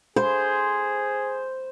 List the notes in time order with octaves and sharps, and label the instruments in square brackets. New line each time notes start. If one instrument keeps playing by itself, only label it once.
[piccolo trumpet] G#4 [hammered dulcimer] C5